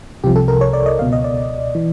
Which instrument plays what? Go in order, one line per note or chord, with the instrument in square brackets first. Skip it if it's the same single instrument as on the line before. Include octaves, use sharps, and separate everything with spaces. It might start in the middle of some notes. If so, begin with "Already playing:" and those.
[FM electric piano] C2 C3 F3 G4
A4
A#4
C#5
D5
D#5
C#2 B2 F5
D#5
D5
E3